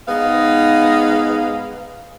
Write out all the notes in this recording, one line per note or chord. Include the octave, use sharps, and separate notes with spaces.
G#2 B3 D#4 G#4 F5